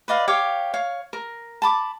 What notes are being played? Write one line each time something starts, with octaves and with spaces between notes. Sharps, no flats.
B4 D5 D#5 F5
G4 C#5 F5 D6
C#5 F5
A#4
A5 B5 D6